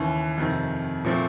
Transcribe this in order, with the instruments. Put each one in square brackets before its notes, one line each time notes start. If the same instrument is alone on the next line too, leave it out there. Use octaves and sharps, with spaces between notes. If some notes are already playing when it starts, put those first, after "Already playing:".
Already playing: [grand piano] D#2 C#3 E3
F2 C3 D#3
A#2 F3 A3 C4